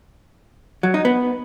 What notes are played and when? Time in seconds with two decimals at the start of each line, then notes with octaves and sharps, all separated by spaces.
0.83 F#3
0.94 D#4
1.05 B3